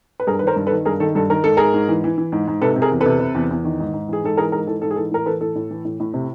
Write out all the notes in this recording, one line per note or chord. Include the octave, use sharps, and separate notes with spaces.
B4
G2 G#4 A#4
B4
D#3 A#4 C5
G2
A4 B4
D#3
G2 G#4 A#4
D#3 A4
G2 A4
D#3 A#4
G#2 A4
G#2 G#4 A#4
G#2
E3
E3
E3
G#2
G#2
C3 A4 B4
C3
G#4 A#4
E2
A4 B4
C3
C3
E2
E2
D#3
G#2
G#2
E3 G#4
G#2 A4
E3 G#4 A#4
G#2 G#4 A#4
E3 A4
G#2 A4
G#4
E3 A4
A2 A#4
E3 A4 B4
A2 A4
A2
E3
A2
A2
C3